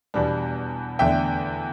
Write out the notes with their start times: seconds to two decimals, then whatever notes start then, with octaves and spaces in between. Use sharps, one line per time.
0.14 E2 B2 G3 D4
0.99 E2 D3 A3 D4 E5 G5